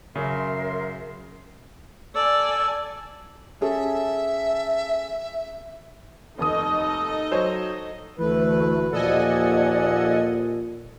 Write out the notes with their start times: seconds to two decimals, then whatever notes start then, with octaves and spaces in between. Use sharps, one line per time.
0.16 F#2 C#3 A#4 E5 C6
2.15 A4 D5 G#5 E6
3.61 C#4 G#4 A4 E5
6.38 F1 D#2 D#4 A4 D#5 D#6
7.31 F#3 C5 C#5
8.19 D2 E3 A3 B4
8.92 D#2 A#2 F3 A4 D5 D#5 F#5 G#5